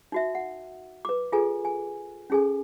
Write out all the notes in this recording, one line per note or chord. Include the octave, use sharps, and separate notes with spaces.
D#4 F#4 E5
F#5
B4 D6
F4 G#4 A4 B4 G#5
G#5
C#4 D#4 G#4 A4 G#5